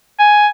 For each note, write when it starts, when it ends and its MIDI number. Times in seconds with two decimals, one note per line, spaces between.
0.19 0.48 80